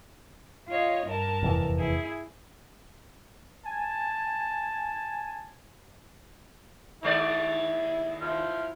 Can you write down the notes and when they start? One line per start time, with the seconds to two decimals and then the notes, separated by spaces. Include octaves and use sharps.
0.69 F4 C#5 D#5
1.08 G2 A#4 A5
1.43 F1 E2 E3
1.78 E4 G#4
3.65 G#5 A5
7.03 D#2 G#3 E4 D5
8.22 F3 E4 F6